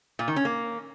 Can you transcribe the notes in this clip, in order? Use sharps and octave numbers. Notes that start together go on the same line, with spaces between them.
A#2
D#3
C#4
A#3